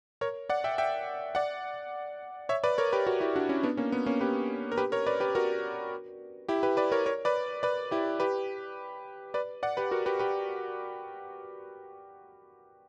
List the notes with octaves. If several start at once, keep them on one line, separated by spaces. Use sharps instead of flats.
A#4 C#5
D5 F#5
E5 G5
E5 G5
D5 F#5
C#5 E5
B4 D5
A#4 C#5
G4 B4
F#4 A#4
E4 G4
D4 F#4
C#4 E4
B3 D4
A#3 C#4
B3
A#3 C#4
G4 B4
A#4
G4 B4
A#4 C#5
B4 D5
G4 B4
F#4 A#4
E4 G4
G4 B4
B4 D5
A#4 C#5
A#4 C#5
B4 D5
B4 D5
E4 G4
G4 B4
B4 D5
D5 F#5
G4 B4
F#4 A#4
G4 B4
G4 B4